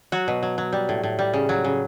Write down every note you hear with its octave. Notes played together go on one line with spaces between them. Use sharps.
F#3 F#4
B2
F#3
F#3
G3
A2
A2
G3
C#3
F#3
C#3